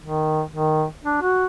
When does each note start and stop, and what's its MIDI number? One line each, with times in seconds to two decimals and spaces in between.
0.02 0.42 51
0.52 0.85 51
1.04 1.18 62
1.22 1.46 66